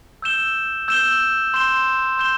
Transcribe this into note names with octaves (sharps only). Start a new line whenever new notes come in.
E6 G6 E7 G7
E6 G6 E7 G7
C6 G6 E7 G7
C6 G6 E7 G7